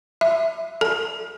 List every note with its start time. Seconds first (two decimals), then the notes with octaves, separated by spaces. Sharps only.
0.21 E5
0.81 A4